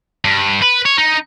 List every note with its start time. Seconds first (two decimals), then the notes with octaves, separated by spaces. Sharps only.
0.25 G2
0.62 B4
0.85 C#5
0.98 D#4